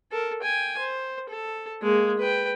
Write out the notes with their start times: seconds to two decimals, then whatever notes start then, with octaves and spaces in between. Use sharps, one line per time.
0.12 A4 A#4
0.43 G5 G#5
0.79 C5
1.30 A4
1.83 G#3 A#3
2.18 B4 G5